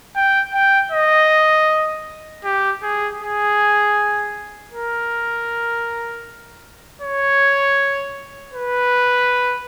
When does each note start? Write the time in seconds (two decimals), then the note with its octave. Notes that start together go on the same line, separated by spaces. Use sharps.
0.16 G5
0.54 G5
0.92 D#5
2.44 G4
2.83 G#4
3.20 G#4
4.73 A#4
7.02 C#5
8.54 B4